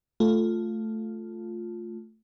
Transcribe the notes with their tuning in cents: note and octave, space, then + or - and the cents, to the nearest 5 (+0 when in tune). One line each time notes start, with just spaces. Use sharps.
A3 +0 F4 +5